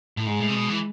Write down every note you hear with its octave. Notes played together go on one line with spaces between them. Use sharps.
A2
G#2 G#3
A2
C3
B2
E3